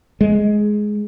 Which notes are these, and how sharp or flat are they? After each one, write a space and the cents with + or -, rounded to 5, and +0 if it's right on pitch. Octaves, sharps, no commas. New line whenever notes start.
G#3 +10